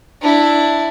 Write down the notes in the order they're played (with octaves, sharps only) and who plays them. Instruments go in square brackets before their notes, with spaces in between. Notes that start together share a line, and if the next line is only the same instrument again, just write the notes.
[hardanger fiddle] D4 E4